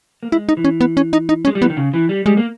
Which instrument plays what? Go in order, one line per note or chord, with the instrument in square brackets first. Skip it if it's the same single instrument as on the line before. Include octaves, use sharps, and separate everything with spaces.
[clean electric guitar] A#3
[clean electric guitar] G#3 [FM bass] E4
[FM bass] D#4
[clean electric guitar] E3
[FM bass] C#4
B3
C#4
D#4
D#4
[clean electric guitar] G#3 [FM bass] C#4
[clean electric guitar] G3
[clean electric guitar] E3 [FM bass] B3
[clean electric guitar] D#3
C#3
E3
G3
[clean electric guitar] G3 [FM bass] G#3
[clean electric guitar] A#3